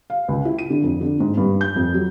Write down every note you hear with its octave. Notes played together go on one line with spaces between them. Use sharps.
F5
C#2
E4
D#7
D3
F2
D3
G#2
G2
G6
F2
F#3